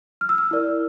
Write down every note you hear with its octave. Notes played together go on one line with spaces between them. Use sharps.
F6
E6
F6
E4 A#4 D5